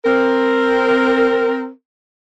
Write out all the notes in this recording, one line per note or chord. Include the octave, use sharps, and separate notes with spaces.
C4 A#4